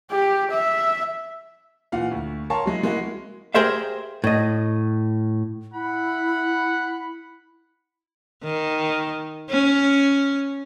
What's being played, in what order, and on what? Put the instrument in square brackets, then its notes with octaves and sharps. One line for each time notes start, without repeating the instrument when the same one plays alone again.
[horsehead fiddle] G4
E5
[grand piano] A#2 E3 F5 F#5
D2
A#4 C#5 F5 A5 C6
F#3 G#3 E4
G#3 A#3 E4 F#4
[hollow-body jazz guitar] G4 G#4 A#4 C5 E5 F5
A2 D#5
[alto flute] E4 [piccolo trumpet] F#5 [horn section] B5
[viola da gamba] D#3
C#4